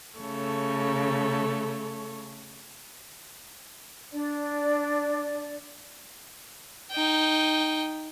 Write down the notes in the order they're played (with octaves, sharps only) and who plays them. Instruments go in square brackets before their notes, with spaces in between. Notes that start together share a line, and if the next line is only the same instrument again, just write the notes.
[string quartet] C#3 A3 A4 C#5
[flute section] D4 D5
[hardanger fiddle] D#4 G5